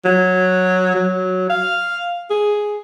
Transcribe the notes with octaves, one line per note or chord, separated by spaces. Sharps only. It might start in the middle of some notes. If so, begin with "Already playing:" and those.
F#3
F#3
F5
G#4